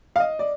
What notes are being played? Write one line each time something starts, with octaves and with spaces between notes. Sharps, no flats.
F5
D#5
D5